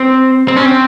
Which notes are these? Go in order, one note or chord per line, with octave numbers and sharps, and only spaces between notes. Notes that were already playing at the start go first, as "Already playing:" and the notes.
Already playing: C4
C4
C#4
C4